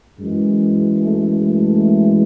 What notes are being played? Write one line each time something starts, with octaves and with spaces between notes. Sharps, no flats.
F#2 E3 G#3
A3
A3